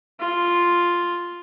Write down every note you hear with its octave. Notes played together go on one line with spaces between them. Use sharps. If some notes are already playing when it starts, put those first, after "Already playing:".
F4